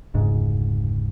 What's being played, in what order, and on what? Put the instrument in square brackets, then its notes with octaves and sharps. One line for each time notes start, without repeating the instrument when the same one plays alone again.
[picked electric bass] F1 D2 G#2 C#3